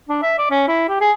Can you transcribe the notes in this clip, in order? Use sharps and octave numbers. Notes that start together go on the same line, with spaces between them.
D4
E5
D5
C#4
E4
G4
G#4